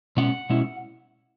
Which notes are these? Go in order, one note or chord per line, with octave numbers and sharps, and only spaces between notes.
B2 G#3 C#4 F#5
B2 G#3 C#4 E4